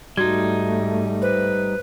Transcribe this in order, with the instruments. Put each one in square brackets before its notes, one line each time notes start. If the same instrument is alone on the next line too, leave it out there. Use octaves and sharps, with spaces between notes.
[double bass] G#2 A3 [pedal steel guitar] G3 D#4 [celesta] F#4 G#6
[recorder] B4 [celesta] C5